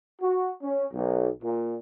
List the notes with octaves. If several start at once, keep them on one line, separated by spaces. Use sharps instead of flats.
F#4
C#4
B1
A#2